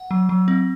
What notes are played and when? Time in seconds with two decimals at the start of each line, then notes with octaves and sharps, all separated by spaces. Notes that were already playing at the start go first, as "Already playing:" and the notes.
Already playing: F#5
0.11 F#3
0.29 F#3
0.48 C4